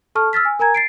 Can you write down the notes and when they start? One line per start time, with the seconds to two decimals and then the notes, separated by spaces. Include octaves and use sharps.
0.15 A4 A5 C#6 F6
0.33 E6 F6 A6 B6
0.45 G#5
0.59 A#4 G#5 A#5 G#6
0.75 A6 C7 D7